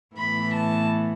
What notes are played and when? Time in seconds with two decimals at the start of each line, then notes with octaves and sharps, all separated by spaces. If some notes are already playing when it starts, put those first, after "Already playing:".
0.17 A2 E3 B3 B5
0.53 A5